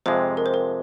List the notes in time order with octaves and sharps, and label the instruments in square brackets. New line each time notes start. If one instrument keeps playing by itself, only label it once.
[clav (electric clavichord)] F2 C3 F3 G#3 [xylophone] C5
[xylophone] A#4
C5
A#4